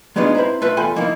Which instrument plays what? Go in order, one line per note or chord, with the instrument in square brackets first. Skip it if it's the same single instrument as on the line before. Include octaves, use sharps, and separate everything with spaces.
[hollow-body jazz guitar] F#3 G#3 B3 D4 D#4 F4
C4 E4 B4 C5 A#5
A3 F4 B4 E5
E2 F4 A4 G5 G#5 B5
F3 A#3 D#4 E4 F5